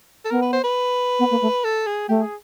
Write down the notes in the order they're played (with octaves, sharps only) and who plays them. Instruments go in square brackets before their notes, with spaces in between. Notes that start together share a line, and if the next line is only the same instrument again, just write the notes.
[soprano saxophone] A4
[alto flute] B3 [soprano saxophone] A#4
[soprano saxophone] B4
C5
B4
[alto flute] B3
A#3
A3
[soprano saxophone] A4
G#4
[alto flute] A3 [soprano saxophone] G4
[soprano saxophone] G#4